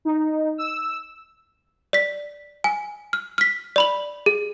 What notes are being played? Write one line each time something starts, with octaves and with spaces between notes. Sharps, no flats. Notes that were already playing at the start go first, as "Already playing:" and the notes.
D#4
E6
D5 B6
G#5
F6
F6 B6
D5 B5 F#7
G#4